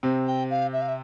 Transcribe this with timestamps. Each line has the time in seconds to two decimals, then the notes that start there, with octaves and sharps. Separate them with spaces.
0.03 C3 C4
0.27 G5
0.50 F5
0.73 E5
0.81 F5
0.88 E5